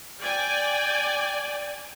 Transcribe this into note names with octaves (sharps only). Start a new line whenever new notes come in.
D5 G5 G#5